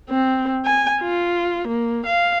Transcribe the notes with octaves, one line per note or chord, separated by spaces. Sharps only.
C4
G#5
F4
A#3
F5